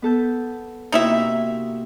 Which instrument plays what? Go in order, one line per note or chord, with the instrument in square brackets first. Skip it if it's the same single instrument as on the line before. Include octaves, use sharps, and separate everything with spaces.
[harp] B3 A4 G6
[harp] C3 A#3 F#4 [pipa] D#4 E4 E5